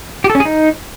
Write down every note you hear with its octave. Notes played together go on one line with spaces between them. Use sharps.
G4
A4
C#4
G#4
D#4